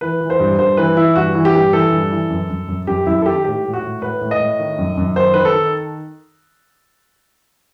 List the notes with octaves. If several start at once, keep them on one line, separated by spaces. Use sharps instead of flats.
E3 B4
E3
C5
G2
G2 C5
E3 B4
E3 E4
G2 F#4
E3
G4
G2
E3 A4
G2
E3
F#2
F#2
F#2
F#2 G4
F#2 E4
A4
D#3 G4
A2 G4
A2
F#4
A2
A2 B4
A2
D#5
A2
D#3
F#2
F#2
D#3 C5
D#3 B4
A4
D#3